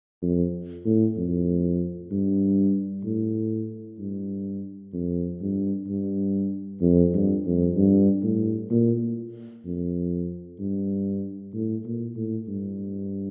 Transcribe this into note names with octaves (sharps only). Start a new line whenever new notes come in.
F2
A2
F2
G2
A2
G2
F2
G2
G2
F2
G2
F2
G2
A2
A#2
F2
G2
A2
A#2
A2
G2